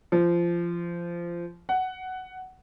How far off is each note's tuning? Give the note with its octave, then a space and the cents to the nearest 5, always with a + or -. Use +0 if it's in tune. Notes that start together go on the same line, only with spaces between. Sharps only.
F3 -20
F#5 +10